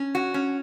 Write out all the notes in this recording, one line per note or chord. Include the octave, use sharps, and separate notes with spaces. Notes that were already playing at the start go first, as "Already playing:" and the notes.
Already playing: C#4
F#4
C#4